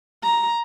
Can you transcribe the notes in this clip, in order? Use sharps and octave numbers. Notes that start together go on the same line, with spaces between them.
A#5